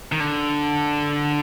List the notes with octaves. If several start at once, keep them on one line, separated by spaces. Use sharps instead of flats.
D#3
D3